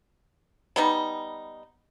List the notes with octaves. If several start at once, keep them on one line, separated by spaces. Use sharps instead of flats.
G3 B3 D#4